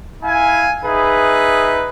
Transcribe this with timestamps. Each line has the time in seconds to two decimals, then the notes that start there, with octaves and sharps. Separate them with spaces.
0.23 E4 F5 G#5
0.84 D#4 G#4 B4 E5